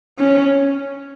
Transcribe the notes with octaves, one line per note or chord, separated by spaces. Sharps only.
C#4